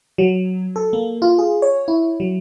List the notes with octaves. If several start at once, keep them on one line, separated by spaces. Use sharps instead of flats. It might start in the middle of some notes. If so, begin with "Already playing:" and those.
F#3
A4
A#3
F4
G#4
C#5
E4
F#3